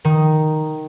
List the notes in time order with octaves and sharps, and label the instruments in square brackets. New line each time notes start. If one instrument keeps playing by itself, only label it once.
[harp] D#3